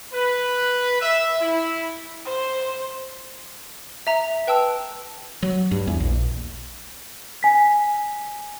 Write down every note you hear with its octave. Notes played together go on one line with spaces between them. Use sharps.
B4
E5
E4
C5
E5 A#5
B4 G5 A5 E6
F#3
G2
E2
A#1
G#5 B6